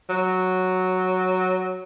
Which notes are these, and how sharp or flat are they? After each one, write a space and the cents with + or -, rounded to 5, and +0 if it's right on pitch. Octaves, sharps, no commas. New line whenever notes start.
F#3 +0